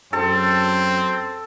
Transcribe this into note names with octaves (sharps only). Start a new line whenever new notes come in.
F#2 C4 A4